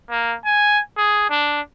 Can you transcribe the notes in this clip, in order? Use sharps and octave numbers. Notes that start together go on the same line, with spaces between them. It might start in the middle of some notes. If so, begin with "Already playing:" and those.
A#3
G#5
G#4
D4